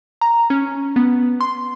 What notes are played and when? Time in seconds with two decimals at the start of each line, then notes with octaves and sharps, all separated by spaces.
0.21 A#5
0.50 C#4
0.96 B3
1.41 C6